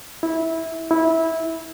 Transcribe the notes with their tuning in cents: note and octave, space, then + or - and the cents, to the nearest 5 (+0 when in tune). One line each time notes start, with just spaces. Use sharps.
E4 -15
E4 -15